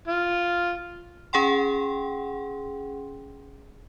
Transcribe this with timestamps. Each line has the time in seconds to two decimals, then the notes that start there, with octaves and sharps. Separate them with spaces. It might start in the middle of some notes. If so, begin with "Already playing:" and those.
0.08 F4
1.33 C#4 G#4 F#5 G5 C6